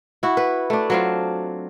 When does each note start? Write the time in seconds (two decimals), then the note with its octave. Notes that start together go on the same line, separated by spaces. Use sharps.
0.23 E4 F#4
0.37 B4
0.70 A3 D4
0.90 F#3 C4 F4